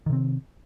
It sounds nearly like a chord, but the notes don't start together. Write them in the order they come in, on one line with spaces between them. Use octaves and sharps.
D#3 C3 C4